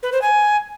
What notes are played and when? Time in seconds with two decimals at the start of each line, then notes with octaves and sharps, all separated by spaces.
0.03 B4
0.12 C5
0.22 G#5